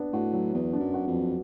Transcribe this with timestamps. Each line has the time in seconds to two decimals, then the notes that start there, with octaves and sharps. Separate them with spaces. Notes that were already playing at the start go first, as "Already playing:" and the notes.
Already playing: B3 D4
0.13 A2 F#4
0.33 F#3
0.54 E2 B3
0.73 D4
0.80 F#2
0.94 F#4
1.07 F2
1.13 F#3